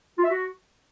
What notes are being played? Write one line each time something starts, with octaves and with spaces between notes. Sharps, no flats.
F4
E5
F#4